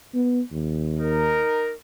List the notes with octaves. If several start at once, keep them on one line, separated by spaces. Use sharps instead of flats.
B3
D#2
D#4 A#4